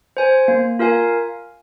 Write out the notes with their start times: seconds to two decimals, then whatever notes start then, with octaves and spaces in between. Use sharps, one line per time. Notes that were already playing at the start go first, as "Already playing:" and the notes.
0.17 C5 G#5
0.48 A#3
0.79 F4 A#4 F5 G#5